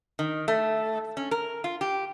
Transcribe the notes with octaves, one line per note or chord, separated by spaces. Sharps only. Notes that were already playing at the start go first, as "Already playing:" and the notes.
D#3
A3
C#4
A#4
F4
G4